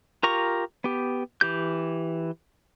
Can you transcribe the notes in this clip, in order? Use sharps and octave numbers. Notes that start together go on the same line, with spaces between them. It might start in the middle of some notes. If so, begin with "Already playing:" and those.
F4 G4 A#4 A#5 C#6
B3 G4
E3 G4 G6